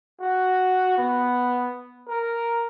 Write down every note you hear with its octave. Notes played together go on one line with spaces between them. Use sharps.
F#4
B3
A#4